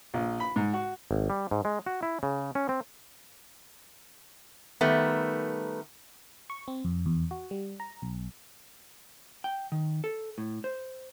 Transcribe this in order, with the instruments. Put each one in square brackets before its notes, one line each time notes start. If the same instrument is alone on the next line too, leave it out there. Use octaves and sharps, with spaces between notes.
[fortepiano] A#1
B5
G#2
F#4
[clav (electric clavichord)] G#1
G3
G#2
G#3
F#4
E4
C#3
C#4
C4
[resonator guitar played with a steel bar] D#3 G3 A3 B3
[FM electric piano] C#6
C4
F2
E2
F#4
G3
A#5
B1
[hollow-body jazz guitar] G5
D#3
A4
A2
C5